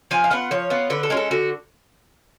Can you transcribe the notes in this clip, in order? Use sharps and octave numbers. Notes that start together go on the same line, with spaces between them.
F3 G#5
F5
B3 F4 F#5
F3 C#5
B3 F4
D3 B4
A4
G#3 C#4 F4
A4
D3 F#4